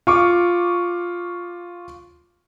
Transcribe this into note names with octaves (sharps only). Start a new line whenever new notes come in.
F4 C#6 D6